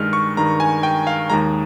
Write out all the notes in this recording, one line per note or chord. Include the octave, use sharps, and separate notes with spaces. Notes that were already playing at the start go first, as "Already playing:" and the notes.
Already playing: G2 D#3 G#3 F6
C#6
G2 D#3 G#3 A#5
G#5
G5
F5
D#2 D#3 G#3 A#5